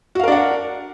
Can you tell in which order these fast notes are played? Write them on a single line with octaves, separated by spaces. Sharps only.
F#4 F5 A#4 D4 F#5